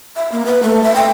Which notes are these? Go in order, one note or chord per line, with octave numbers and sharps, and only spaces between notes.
E5
A#3
B4
A3
E5
G5